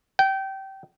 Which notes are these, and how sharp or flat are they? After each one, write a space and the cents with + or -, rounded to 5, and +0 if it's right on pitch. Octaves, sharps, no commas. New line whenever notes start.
G5 -20